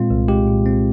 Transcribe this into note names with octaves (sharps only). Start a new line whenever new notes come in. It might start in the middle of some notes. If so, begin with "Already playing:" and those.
Already playing: A#2 G#3 C4 F4
C2
G#3 G4
A#2
C4